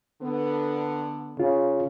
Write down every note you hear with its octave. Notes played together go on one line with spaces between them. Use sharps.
D3 B3
C#3 F4